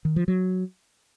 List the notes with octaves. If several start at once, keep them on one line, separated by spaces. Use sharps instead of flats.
D#3
F3
F#3